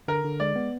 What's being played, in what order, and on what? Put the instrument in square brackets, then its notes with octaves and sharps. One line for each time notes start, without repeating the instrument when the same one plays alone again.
[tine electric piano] D3 [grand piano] A#4
[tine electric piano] D3
[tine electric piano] G#3 [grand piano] D5
[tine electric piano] B3